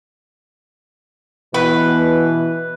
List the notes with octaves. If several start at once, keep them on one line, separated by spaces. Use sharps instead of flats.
B2 E3 B4